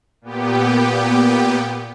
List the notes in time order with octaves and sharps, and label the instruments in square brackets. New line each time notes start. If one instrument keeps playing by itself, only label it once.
[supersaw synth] A#2 B3 G4